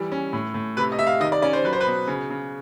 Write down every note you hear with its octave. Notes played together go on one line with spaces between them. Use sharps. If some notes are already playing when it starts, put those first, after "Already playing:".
Already playing: E3 G3
C#4
A2
A2
C3 B4
D#5
C3 E5
F5
D#3 D#5
D5
C#4 D5
C5
F#3 B4
C5
B4
B2
C#3
C#3